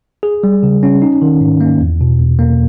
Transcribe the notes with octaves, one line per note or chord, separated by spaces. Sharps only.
G#4
G3
C#3
C#4
D#4
D#3
G#2
A#3
E2
B2
E2
A#3